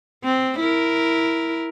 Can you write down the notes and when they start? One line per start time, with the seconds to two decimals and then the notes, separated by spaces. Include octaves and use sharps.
0.24 C4
0.60 E4 A#4